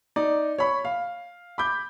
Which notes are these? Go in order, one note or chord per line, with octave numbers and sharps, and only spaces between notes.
D#4 D5
C#5 B5 C#6
F5
B5 D6 G6